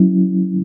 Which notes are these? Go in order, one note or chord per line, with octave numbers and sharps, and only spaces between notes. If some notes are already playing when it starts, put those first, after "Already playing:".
Already playing: F#3 C#4 E4